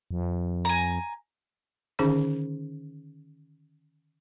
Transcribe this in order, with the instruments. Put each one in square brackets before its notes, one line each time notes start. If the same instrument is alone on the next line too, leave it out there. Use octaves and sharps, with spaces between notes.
[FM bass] F2
[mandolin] G#5 A#5
[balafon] D3 D#3 C#4 D#4 G#4